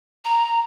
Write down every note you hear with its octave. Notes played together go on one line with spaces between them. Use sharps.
A#5